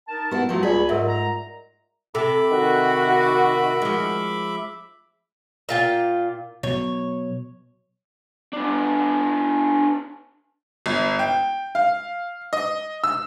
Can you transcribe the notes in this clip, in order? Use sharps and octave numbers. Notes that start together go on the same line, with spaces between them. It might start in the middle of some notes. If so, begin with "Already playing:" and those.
D#4 A#4 A5
B3 E4 G4 F#5
F3 F#3 A3
C#2 F4 G#4 C#5 D5 B5
G#2 F#3 A4 A#4 E5
A#5
C3 A4 E5 B5 D6
D#3 F#4
F3 G#3
A#2 F4 G5
B2 F#3 C#5
B3 D4
G1
G5
F5
D#5
E6